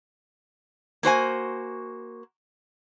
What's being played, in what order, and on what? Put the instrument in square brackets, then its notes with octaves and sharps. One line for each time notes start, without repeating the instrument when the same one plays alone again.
[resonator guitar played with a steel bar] A#3 F#4 C5 G#5